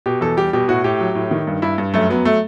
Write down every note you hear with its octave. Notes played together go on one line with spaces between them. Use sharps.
B2 G4
E2 A4
G3 G4
B2 G4
A2 F#4
A2 G4
F#3
A2
D#3
G2
G2 E4
G2
F#2 A3
F#3 B3
A3